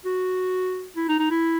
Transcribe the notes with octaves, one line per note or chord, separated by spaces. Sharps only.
F#4
E4
D#4
D#4
E4